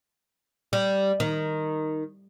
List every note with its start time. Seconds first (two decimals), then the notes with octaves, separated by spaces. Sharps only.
0.73 G3
1.20 D#3